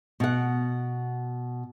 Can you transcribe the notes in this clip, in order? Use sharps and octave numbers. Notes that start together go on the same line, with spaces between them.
B2 F#5